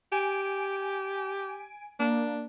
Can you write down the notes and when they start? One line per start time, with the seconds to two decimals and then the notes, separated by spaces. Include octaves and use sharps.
0.12 G4 G#5 D7
1.99 A#3 D4